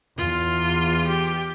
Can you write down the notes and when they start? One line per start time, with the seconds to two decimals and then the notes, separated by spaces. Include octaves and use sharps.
0.18 E2 F4
1.08 G4